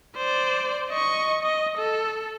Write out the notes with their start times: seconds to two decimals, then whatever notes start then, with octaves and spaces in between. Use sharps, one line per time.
0.16 C5 D5
0.89 D#5 C#6
1.42 D#5
1.78 A4